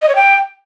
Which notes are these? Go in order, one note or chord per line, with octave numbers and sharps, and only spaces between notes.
D#5
C#5
G5